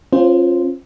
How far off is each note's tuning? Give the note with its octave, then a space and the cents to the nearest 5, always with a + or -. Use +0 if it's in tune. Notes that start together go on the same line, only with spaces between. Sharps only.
C#4 -35 F4 +0 C5 -10